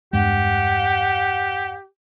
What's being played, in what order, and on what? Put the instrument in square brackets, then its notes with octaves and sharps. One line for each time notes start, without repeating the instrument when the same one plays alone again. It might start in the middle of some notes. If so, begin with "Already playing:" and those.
[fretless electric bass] E2 G2 G#3 [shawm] G4 [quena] F#5